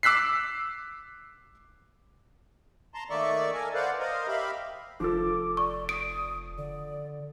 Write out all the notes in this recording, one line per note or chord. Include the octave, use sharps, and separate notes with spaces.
D6 E6 F#6 B6 C7
A5 A#5 C6
D#3 A3 A#3 D5 E5 C#6
A4 A#4 G#5
B4 C5 D5 F5 F#5
A#4 C5 D#5 F5
G4 E5 F5 B5
F1 F3 A4 D6
D5 C#6
D#6 D7
D3 D5